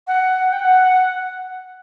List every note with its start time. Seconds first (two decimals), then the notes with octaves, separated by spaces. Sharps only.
0.07 F#5
0.53 G5
0.59 F#5